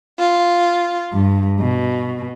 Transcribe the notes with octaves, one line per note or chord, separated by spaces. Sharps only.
F4
G2
B2